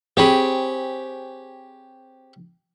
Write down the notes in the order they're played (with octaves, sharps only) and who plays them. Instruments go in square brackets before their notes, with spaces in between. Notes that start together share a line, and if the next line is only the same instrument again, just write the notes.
[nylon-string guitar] C4 G#4 [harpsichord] G4 C#5 B5